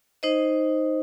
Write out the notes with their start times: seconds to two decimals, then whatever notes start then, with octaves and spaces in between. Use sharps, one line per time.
0.23 D#4 C5 D#5